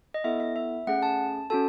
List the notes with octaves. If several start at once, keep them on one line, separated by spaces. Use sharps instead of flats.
D#5
B3 E4 A4 E5
E5
E5
A3 C#4 G#4 F#5
A5
C#4 F#4 A4 A5